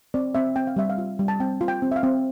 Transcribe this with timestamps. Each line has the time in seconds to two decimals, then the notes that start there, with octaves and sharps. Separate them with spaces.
0.14 C4 D5
0.35 C4 E5
0.56 C4 G5
0.67 F5
0.76 G3 E5
0.90 F5
0.98 F4
1.19 G3
1.28 A5
1.40 C4 G5
1.61 F4
1.68 G5
1.82 C4
1.92 E5
1.96 F5
2.03 C4